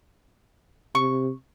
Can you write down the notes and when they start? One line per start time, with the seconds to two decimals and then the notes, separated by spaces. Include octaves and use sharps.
0.95 C3 C#6